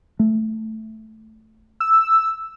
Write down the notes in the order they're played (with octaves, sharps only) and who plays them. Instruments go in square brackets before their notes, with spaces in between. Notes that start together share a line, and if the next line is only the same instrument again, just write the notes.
[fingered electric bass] A3
[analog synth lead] E6